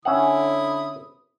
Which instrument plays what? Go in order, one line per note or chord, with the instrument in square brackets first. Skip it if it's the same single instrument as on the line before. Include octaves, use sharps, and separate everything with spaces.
[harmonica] D3 E4 D#6 [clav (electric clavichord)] C#4 E5 F#5